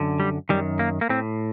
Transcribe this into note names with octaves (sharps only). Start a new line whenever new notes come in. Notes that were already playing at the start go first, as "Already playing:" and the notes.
Already playing: F#2 D3
G3
F#2 D#3 G3
A#3
A#3
A2 C4